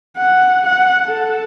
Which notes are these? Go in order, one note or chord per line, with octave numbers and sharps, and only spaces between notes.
F#5
F#5
A4